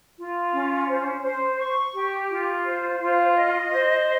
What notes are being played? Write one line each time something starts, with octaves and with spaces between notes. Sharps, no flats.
F4
C#4
C5
C5
C#6
G4
F4
C5
F4
D#5
C5